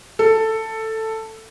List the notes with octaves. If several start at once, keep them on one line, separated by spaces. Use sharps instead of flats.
A4